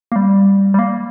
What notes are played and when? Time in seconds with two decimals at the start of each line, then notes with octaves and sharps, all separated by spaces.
0.12 A#3
0.16 G3
0.74 G3
0.79 A#3